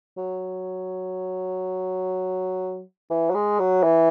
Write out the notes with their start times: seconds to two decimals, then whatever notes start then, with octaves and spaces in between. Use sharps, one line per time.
0.17 F#3
3.10 E3
3.30 F#3
3.35 G#3
3.59 F#3
3.83 E3